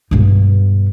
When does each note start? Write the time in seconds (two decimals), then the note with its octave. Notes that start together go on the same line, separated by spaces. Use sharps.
0.11 G2 B2